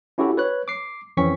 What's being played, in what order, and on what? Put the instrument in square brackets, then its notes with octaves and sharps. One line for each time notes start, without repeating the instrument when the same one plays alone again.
[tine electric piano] C#4 E4 F#4 G4 A4
B4 C#5 F#6
D6 C7
F2 E3 C4 C#4 C#6 B6